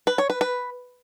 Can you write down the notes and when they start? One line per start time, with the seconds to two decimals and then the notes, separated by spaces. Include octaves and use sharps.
0.07 B4
0.18 C#5
0.30 B4
0.41 B4